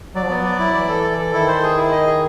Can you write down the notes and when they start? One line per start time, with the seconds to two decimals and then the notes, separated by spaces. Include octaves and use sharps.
0.15 F#3 D5
0.24 F3
0.29 F#3 B3
0.45 D5
0.59 E4
0.74 E3 D5
0.89 A4
1.03 D5
1.18 A4
1.33 D#3 E4
1.48 C5
1.63 G#4
1.77 E4
1.92 D#5
2.07 G#4